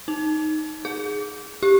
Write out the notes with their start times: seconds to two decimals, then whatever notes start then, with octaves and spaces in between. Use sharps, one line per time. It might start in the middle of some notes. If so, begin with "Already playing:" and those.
0.08 D#4
0.85 G#4
1.63 G4